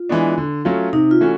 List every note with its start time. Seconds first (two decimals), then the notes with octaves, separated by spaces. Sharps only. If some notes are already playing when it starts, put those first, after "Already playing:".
Already playing: F4
0.09 E3 G#3 B3 D4
0.38 D3
0.65 F#3 A3 C#4 F4
0.93 C3 D#4
1.11 F4
1.21 E3 A3 C#4 F#4